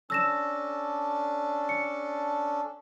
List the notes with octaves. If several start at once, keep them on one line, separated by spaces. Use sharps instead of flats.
C#4 D4 A4 E6 A#6 E7
C#7